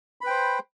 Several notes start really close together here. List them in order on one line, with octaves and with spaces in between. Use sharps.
B5 B4 G5 C5